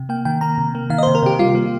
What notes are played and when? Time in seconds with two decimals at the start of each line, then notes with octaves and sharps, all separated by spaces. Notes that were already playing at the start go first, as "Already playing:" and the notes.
Already playing: C3
0.09 A#3 G5
0.25 D#3 G5
0.41 A#3 A#5
0.58 C3
0.75 A#3
0.90 D#3 F5
0.98 D#5
1.03 C3 C5
1.15 A#4
1.23 C3 G4
1.39 G3 F4
1.55 A#3